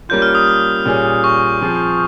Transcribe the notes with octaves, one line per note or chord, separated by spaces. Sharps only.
G3 A#3 C#4 F4 G6
F6
D#6
D#6
A#2 G3 C#4 G#4
C#6
F3 C4 F4 G#4